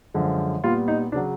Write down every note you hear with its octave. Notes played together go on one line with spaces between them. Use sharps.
F#2 D3 F3 G#3
A#2 G3 B3 F4
D#4
C#3 F#3 D4